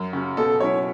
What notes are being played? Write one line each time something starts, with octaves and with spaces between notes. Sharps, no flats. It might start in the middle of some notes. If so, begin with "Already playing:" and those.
Already playing: F#2
C#3 F#3
B2 A4
F#3 C#4 E4 C#5